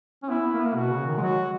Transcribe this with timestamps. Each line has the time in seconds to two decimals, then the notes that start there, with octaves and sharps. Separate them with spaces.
0.23 C#4
0.29 B3 E4
0.41 B3
0.53 A#3
0.59 B3
0.65 A#3
0.75 B2 F#4
0.90 C#3
1.06 D#3
1.17 G#3
1.21 F#3 F#4